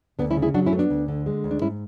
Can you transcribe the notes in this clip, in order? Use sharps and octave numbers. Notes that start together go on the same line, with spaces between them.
D2 B3 D4
C#4 E4
C#3
E4 G#4
F#3 D4 F#4
C#4 E4
A3
B3 D4
D2
D3
G#3
D2
D4
G#2 C#4 E4